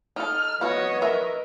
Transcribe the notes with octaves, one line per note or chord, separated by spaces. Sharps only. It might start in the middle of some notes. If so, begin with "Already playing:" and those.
D#4 A4 F6
B3 F#4 B4 C#5 D#5
A#4 E5